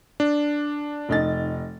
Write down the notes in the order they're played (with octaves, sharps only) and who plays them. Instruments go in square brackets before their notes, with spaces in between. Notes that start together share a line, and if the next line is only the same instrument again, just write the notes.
[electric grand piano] D4
[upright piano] F1 D#4 A6